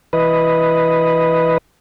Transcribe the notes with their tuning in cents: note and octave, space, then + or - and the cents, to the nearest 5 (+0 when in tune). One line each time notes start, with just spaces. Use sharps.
E3 +0 B4 +0 D#5 +0